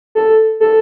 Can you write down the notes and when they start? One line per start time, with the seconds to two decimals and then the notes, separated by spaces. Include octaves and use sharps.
0.15 A4
0.60 A4